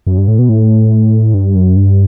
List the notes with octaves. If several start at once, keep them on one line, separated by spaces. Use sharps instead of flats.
F#2
G2
A2
B2
A2
G2
F#2
G2